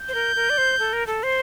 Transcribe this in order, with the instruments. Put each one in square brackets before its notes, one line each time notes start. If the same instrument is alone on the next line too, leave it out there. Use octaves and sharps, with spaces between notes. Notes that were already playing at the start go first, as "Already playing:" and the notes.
Already playing: [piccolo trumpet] G6
[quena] C5
A#4
A#4
D5
C5
A4
A#4
A4
C5